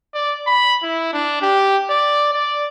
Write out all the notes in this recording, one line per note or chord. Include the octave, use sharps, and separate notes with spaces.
D5
B5
E4
D4
G4
D5
D5